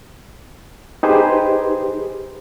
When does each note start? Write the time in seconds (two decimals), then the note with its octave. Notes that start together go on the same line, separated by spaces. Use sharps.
1.03 D#4 G4 G#4 B4 C5